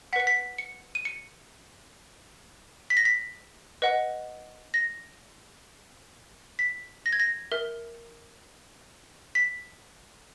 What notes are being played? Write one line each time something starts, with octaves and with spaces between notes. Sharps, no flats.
B4 F#5 B6 C#7
B6
C#7
D#7
C#7
B6
A#6
B6
B4 D#5 F#5
A#6
B6
A#6
G#6
A#6
A#4 E5
B6